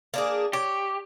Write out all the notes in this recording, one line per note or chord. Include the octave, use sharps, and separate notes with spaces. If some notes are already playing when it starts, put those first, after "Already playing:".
A#3 D4 G#4
G4 C#5